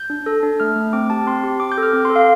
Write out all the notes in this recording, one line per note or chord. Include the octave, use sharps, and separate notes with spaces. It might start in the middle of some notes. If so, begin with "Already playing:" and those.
Already playing: G6
D4
A4
D4
A3 F6
A3
C4 D6
G4 A5
C4 C6
G4
C4 D6
G6
A4
F6
C4 D6
C6
A4
F5